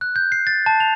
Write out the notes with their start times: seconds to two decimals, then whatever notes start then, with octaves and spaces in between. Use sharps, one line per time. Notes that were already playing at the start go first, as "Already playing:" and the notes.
0.01 F#6
0.16 G6
0.32 C7
0.47 A6
0.66 A5
0.80 F7